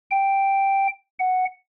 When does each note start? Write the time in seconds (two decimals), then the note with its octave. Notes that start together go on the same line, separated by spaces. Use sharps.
0.11 G5
1.19 F#5